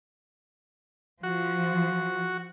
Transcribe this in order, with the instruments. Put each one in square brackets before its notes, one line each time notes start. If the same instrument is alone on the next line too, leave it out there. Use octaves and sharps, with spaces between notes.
[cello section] F3 [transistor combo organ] F#4